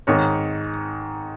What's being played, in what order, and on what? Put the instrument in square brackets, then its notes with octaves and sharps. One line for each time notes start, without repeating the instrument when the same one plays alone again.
[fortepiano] G#2 D#3 C#5